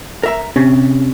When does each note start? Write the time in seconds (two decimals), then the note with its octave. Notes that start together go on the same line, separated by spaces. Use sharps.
0.23 A#4 E5 A#5
0.56 C3 C#4